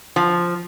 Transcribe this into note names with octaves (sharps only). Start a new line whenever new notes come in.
F3